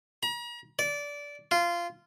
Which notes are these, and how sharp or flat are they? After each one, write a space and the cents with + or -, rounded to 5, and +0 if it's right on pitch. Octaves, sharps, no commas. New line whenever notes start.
A#5 +40
D5 -20
F4 -20